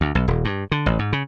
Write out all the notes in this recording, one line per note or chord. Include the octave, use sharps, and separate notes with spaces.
D2
B1
D#1
G2
D3
A1
G#2
C#3